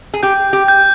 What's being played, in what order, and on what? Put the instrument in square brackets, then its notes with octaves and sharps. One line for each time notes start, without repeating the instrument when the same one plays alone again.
[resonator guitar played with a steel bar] G#4
[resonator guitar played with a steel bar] G4 [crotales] G6
[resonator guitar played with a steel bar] G4
[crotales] G6